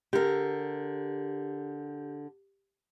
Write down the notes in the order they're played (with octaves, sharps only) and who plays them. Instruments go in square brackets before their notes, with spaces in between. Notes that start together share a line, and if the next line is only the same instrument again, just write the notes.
[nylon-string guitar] D3 A#4 [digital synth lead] G4